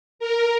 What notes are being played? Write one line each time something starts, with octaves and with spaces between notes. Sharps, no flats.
A#4